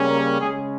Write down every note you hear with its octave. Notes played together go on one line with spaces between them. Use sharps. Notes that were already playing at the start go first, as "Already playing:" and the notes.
Already playing: C#3 G3 A#3 C#4
A#4
C#3 G#3 C#4 G#4